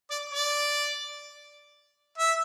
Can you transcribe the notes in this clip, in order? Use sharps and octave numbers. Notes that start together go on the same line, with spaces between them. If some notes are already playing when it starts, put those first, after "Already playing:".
D5
D5
E5